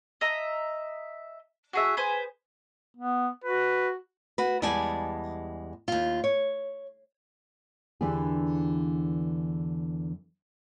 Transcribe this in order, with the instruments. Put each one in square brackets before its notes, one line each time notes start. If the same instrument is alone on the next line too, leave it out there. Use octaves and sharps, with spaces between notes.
[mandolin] D#5 E5 A#5
F#4 G#4 E5
G#4 B4 C5 G#5
[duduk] B3
[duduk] F#4 [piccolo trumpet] B4
[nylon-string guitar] F#4 B4
E2 G3 G#3 D5 G#5 A5
D#2 F4
C#5
E2 D3 E3 D4 G4 G#4